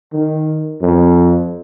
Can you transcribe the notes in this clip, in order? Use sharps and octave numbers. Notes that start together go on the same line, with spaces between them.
D#3
F2